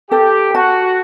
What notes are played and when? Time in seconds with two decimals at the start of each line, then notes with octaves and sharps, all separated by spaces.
0.11 G4 A4
0.55 F#4 A5